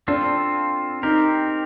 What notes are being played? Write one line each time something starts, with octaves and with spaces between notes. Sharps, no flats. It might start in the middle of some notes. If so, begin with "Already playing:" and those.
C4 D4 F4 A4
C4 D#4 G4 A#4